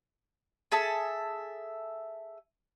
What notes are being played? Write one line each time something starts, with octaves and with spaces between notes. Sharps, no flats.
G#4 A4 E5 A5